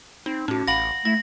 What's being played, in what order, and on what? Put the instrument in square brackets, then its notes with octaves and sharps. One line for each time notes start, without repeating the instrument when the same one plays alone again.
[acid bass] C4 [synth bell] D#4
[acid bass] A2 [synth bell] C#4 F#4
[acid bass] A1 [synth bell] F5 F#5 B5 [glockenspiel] A#6 F#7
[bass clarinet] A3 [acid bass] E4 [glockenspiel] A#6